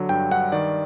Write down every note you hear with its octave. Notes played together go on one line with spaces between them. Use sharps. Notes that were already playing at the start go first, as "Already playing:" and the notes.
Already playing: D3 F#3
G2 G5
G2 F#5
D#3 D5